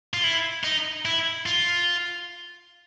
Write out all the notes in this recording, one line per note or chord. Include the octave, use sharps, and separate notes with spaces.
F4
E4
D#4
E4
F4